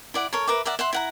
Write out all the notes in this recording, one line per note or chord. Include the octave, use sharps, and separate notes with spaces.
E4 D5 F#5
A4 A#4 C#5
A#4 B4 E5 D6
A#4 D5 E5 F#5
E5 F#5 C6
E4 F#5 A#5